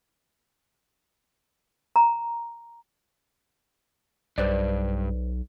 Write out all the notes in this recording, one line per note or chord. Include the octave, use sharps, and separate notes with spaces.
A#5
B1 G2 B4 C5 D5